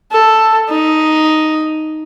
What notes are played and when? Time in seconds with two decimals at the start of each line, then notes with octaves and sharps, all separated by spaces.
0.12 A4
0.69 D#4